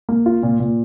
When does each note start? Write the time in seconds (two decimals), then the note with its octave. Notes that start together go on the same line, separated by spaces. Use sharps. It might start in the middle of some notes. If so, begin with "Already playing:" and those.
0.09 A#3
0.26 F4
0.43 A#2
0.60 A#2